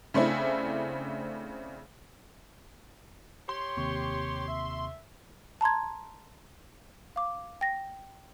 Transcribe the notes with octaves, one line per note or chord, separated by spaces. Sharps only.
C#3 A3 C4 D4 E4
G4 C#5 C6
D#2 C3 C#6
E5
A5 A#5 C6 G#6
F5 D6
G5 A#6